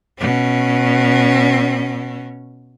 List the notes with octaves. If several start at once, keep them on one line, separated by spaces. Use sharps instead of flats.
B2 C#4